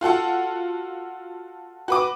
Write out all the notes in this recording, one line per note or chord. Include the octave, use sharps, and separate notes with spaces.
F4 F#4 A4 F#5
F#4 B4 D6